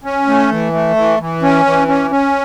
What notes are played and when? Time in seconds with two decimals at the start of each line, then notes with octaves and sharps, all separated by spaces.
0.04 C#4
0.27 A3
0.51 E3
0.73 A3
0.96 E3
1.20 E3
1.42 C#4
1.66 E3
1.88 C#4
2.11 C#4